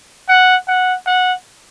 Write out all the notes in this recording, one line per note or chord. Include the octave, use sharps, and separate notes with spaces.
F#5
F#5
F#5